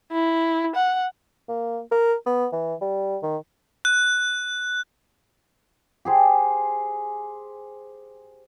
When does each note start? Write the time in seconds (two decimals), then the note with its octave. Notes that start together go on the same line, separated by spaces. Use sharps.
0.12 E4
0.76 F#5
1.49 A#3
1.91 A#4
2.26 B3
2.53 E3
2.81 G3
3.23 D#3
3.85 F#6
6.05 G4 G#4 C5